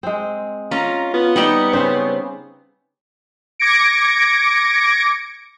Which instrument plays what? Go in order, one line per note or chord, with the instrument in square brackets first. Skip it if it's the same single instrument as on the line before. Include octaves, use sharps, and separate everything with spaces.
[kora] G#3 C4
[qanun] C#4 [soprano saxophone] F4 [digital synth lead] A#5
[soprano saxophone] B3 [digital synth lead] F4
[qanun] G3 D#4 G4 [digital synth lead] C#7
[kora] C#3 C4 C#4 [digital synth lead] C5
[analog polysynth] D6 G#6 A#6 C#7 D7